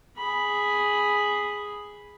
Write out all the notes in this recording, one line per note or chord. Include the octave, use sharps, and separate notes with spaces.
G#4 B5